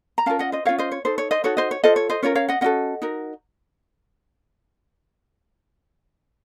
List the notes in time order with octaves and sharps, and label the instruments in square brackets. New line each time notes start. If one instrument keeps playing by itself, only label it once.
[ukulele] A#5
C#4 F4 A#4 F5 A5
D#5 F#5
C5 D#5
C#4 F4 A#4 C#5 F5
C5 D#5
C#5
D#4 A4 C5
C#5
C5 D#5
D#4 F#4 A4 C#5
C5 D#5
C#5
F4 A4 C5 D#5
C#5
C5 D#5
C#4 F4 A#4 C#5
C#5 F5
D#5 F#5
C#4 F#4 A4 D#5 F#5
D#4 F#4 A#4